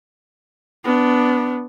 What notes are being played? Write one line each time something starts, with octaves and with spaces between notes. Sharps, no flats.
B3 D4